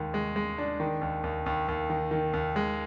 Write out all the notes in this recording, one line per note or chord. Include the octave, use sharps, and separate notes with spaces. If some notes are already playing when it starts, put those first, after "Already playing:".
Already playing: D#2 D#3 G#3
G#3
G#3
D4
D#3
D#2
D#2
D#2
D#2
D#3
D#3
D#2
G#3